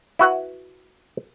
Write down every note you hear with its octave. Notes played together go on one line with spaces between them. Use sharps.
E4 F#4 B4 F#5